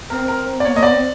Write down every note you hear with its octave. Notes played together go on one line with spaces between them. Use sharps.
C4 A#4
A#4
D5
B3 C#5
A#3 D#5
B3 D5
C4